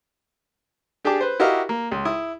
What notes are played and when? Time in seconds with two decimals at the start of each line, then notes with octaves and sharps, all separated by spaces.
1.05 D4 G4 G#4 G5 A5 D6
1.21 B4 C5
1.40 E4 F#4 G4 A#4 D#5 F5
1.69 A#3
1.92 C#2
2.05 E4 D#6